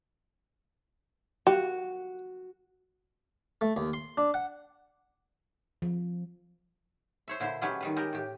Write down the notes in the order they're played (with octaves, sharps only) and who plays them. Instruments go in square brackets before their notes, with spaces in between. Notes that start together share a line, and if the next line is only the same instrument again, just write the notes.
[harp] F#4 [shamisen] G4
[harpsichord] A3
D#2
C6
D4
F#5
[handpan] F3
[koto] C5 C#5 E5
A#2 D3 E4 C5
D3 F#3 G#3 C#4 G4 B4
D#3 G3 B4
G#3 G4 A#4
A2 G4